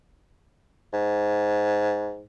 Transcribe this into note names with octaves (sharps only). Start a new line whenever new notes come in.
G#2